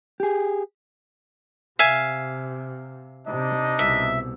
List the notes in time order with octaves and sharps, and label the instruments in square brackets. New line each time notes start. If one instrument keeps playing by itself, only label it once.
[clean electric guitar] G4 G#4
[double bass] C3 [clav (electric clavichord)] E5 G#5 [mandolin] F5
[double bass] C3 [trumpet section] D4 D#4 D#5
[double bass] C2 B2 [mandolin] E5